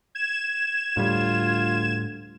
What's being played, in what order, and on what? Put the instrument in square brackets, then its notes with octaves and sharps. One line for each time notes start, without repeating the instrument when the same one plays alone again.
[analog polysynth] G#6 E7
[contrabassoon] D2 [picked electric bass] A2 G3 [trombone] F4